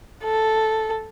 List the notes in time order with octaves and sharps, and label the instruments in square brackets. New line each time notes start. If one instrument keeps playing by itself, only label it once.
[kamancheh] A4